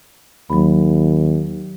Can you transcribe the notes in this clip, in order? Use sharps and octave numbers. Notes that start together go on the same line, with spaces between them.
D#2 F#3 B5